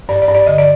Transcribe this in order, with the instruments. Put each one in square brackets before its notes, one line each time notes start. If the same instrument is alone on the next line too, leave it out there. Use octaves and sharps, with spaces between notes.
[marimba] G2 D5
D5
G2
D5
D3 D#5
D5